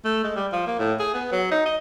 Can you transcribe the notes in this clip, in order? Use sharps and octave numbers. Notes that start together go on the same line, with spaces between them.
A3
G#3
G3
F3
A#3
A2
G#4
B3
F#3
D#4
D#5